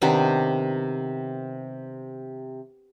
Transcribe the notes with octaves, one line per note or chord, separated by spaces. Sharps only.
C3 D#3 B3 D4